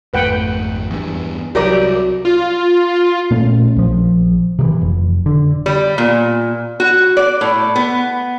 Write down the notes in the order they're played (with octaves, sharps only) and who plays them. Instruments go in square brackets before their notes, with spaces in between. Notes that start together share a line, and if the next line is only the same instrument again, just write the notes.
[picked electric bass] G#1 F2 A3 [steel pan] B4 F#5 G5
[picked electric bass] E2 G2
[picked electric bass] C2 [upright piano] F#3 [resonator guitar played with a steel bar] G4 A#4 D5
[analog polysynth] F4
[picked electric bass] A#2 A3 C#4
A#1 F3
C3 D#3 E3
F1
D3
[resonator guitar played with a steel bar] G3
A#2
F#4
D5
A2
B3